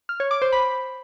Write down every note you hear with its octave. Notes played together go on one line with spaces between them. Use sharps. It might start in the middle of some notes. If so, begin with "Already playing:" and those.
F6
C#5
D6
C5
B5